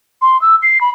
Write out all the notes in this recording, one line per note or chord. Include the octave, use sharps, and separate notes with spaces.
C6
E6
C7
B5